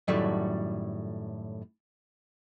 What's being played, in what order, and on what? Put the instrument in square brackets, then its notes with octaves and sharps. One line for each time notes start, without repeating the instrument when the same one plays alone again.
[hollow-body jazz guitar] F#2 A2 D#3 F#3 G3 A3